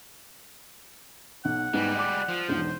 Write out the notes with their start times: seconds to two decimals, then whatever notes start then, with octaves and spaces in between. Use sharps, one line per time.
1.45 B1 F#5
1.74 G#2 G3 G#3 B3
1.96 D5 D6
2.29 F3
2.48 E1 B1 C5